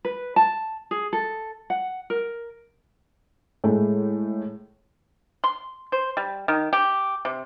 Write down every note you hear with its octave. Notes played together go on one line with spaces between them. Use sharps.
B4
A5
G#4
A4
F#5
A#4
A2 G#3 A3
C6
C5
G3
D#3
G4
C3